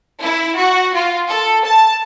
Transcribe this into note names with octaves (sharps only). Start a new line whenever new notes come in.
E4
F#4
F4
A4
A5